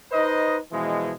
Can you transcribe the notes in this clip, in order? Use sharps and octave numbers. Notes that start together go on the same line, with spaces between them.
D#4 B4 C5 D#5
B2 E3 F3 G#3